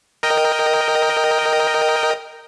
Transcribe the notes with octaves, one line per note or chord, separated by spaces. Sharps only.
A#4 D#5 G5